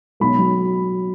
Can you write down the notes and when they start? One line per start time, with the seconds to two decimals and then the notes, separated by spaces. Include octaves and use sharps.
0.20 B1 B5
0.38 F#3